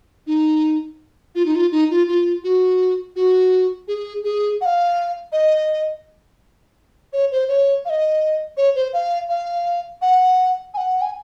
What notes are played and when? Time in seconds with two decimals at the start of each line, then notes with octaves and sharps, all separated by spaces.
0.27 D#4
1.35 F4
1.45 D#4
1.55 F4
1.72 D#4
1.90 F4
2.08 F4
2.44 F#4
3.16 F#4
3.88 G#4
4.24 G#4
4.61 F#5
4.66 F5
5.32 D#5
7.13 C#5
7.31 C5
7.48 C#5
7.85 F5
7.90 D#5
8.57 C#5
8.75 C5
8.93 F5
9.29 F5
10.02 F#5
10.74 G#5
10.77 F#5
11.01 G#5